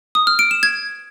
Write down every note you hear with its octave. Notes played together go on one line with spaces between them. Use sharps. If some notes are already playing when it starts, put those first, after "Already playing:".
D#6
F6
D7
E7
G#6